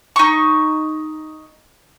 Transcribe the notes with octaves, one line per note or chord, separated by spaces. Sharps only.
D#4 C#6